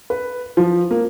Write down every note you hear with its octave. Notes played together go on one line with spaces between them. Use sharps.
B4
F3
A#3